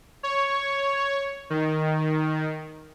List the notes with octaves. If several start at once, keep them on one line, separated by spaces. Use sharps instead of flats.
C#5
D#3